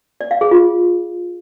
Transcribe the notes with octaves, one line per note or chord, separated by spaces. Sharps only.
D5
F5
G#4
F4